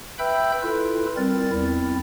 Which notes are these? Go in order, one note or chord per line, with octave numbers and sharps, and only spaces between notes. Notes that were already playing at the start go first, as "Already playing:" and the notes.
B4 E5 G5 B5 E6 G6
E4 F4 A4 B4
G3 C4 A#4 A6
E2 C4 E4